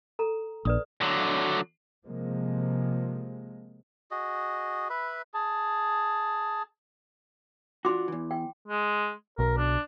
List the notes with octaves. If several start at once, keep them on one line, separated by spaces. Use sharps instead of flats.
A4 A#5
A#1 B4 D5 D#6
D3 F#3
C3 F3 G#3 A#3
F#4 G#4 D#5
B4 E5 B5
G#4 A5
D4 F4 F#4 C6 D6
E2 E3
G5
G#3
B1 A#4
D4